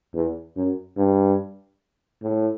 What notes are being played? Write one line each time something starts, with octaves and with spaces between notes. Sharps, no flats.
E2
F#2
G2
A2